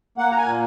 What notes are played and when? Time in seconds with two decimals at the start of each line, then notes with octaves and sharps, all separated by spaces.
0.18 A#3 F#5
0.32 A#5
0.37 G#5
0.46 A#2